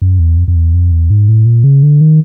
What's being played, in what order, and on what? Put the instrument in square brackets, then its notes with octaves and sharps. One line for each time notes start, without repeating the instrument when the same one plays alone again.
[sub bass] F#2
E2
F2
F2
E2
F2
E2
G#2
A2
A#2
C#3
D3
D#3